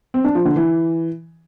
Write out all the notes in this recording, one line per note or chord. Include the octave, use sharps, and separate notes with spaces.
C4
D4
F3
D3
E3